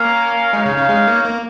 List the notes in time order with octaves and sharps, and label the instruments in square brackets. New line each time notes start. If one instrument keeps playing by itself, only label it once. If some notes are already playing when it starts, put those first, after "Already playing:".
Already playing: [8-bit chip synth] A#3 [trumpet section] C#4 A#4 F5
[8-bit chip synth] G#3 [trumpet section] D#4 C#5 F5
[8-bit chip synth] C#3
C#3
G#3
A#3
A#3